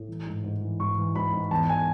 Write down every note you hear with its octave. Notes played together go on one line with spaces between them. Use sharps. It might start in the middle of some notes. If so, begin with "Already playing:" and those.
Already playing: A2
E3
G#2
G#2
E3
G#2 C#6
E3
G#2 B5
G#2
E2 A5
G#5